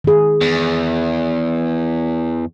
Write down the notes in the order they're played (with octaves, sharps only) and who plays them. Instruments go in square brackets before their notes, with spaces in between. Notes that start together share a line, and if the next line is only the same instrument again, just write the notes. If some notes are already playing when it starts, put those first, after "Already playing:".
[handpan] D#3 G#4
[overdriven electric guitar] E2